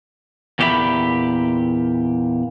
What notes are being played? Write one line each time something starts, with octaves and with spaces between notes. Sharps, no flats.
E2 A#2 G4 A4 E5 B5